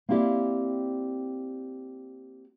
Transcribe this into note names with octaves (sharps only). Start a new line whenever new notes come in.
A#3 C4 E4 G4 D5 F5